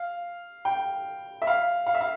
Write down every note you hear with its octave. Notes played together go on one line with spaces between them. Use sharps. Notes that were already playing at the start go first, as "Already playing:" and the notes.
Already playing: F5
G5
E5
F5
F5
E5
F5